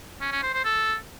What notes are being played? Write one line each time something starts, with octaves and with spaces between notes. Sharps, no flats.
C#4
C#4
C5
C5
A4